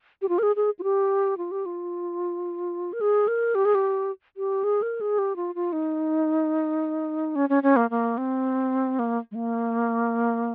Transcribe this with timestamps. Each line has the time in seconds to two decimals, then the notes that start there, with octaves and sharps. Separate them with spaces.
0.22 G4
0.29 F4
0.39 A#4
0.43 G#4
0.56 G#4
0.79 F4
0.83 G4
1.38 F4
1.51 G4
1.66 F4
2.93 A#4
3.01 G#4
3.28 A#4
3.55 G4
3.65 G#4
3.75 G4
4.37 G4
4.64 G#4
4.82 A#4
5.01 G#4
5.18 G4
5.36 F4
5.55 F4
5.72 D#4
7.36 C#4
7.49 C#4
7.63 C#4
7.76 A#3
7.90 A#3
8.18 C4
8.99 A#3
9.31 G#3
9.35 A#3